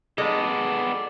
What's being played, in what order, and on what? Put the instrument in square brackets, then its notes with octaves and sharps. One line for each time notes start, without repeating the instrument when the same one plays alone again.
[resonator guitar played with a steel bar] G#3 [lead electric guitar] B3 A4 [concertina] D5